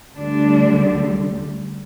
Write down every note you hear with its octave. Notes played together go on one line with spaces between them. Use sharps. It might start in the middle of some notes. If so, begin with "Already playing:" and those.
D2 D3 G3 D4